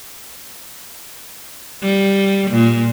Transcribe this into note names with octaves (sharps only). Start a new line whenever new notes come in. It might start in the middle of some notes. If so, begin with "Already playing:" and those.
G3
A#2